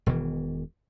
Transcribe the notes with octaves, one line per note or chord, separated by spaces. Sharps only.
E1 B2 D#3 E3